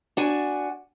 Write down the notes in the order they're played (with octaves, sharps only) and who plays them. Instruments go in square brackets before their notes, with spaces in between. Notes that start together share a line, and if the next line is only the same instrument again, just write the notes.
[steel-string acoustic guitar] D4 F#4 G#5